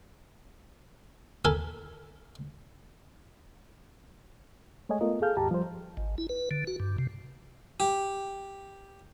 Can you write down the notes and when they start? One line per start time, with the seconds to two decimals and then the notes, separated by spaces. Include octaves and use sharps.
1.45 A4 A#4 G#5 B5
4.89 G#3 A3 C#5 D#5 G#5
5.01 A3 B3 F4 A#4 D#5
5.22 G#4 A4 F5 F6 G6
5.37 D#2 G#2 G4 A5 A#5
5.51 F3 G3 C5
5.97 G#1
6.18 E4
6.29 B4
6.51 D3
6.67 F#4
6.80 G2
6.98 C3
7.80 G4